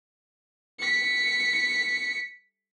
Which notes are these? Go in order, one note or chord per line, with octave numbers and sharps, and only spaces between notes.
B6 C#7